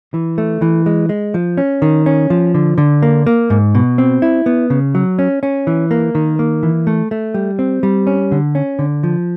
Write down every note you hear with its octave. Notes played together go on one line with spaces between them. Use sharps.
E3
A3
E3
G#3
G#3
F3
C#4
D#3
C#4
F3
D3
D3
A#3
A#3
G#2
B2
C4
E4
B3
C#3
F#3
C#4
C#4
E3
A#3
D#3
A#3
E3
A3
A3
G3
C4
G3
C#4
D3
C#4
D3
F3